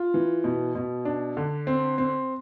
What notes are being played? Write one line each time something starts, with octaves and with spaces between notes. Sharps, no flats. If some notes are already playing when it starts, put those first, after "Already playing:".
Already playing: F4
E3
B2
B2
D4
D3
C4
C4